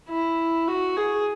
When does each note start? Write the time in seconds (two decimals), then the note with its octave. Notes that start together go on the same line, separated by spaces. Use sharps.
0.09 E4
0.68 F#4
0.97 G#4